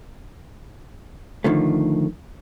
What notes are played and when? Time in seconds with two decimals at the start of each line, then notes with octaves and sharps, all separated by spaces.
1.44 D3 D#3 F3 A3